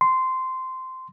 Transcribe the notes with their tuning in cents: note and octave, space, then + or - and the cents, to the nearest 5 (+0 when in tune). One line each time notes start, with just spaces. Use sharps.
C6 -15